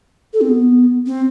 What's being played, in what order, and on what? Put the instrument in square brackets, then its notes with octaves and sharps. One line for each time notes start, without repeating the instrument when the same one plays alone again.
[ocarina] A4
C4
B3
C4